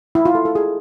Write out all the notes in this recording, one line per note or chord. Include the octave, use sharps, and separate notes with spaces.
E4
F4
A4
A4
G#4